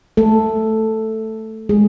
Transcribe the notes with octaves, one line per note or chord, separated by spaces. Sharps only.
A3 A4
G#3 G#4